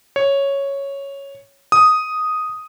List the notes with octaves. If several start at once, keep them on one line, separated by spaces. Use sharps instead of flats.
C#5
D#6